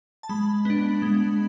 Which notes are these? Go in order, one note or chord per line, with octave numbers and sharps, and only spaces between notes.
A5
G#3 B5
B3 D4
G#3